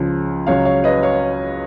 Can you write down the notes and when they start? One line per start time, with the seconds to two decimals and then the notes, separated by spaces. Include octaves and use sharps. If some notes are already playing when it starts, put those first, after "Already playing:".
Already playing: C#2 C#3 F3
0.47 C#2 C#3 F#3 C#5 F5
0.65 C#5 F5
0.84 B4 D#5
1.03 C#5 F5